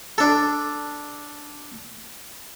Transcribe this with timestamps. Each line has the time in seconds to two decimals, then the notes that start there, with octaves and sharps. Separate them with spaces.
0.18 D4 A4